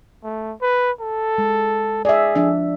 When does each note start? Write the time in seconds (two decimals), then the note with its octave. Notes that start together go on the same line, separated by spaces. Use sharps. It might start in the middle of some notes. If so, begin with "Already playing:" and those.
0.23 A3
0.61 B4
1.00 A4
1.38 G#3
2.05 G#4 D5 E5
2.35 F3 D4 E5